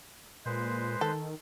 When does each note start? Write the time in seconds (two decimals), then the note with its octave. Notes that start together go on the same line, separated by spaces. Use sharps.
0.46 A#2 G#3 B4 C5
1.01 D#3 A4